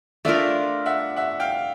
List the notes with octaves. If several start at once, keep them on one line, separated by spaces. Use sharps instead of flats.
A3 D4 F4 A#4 D5 E5
E5 F#5
E5 F#5
F5 G5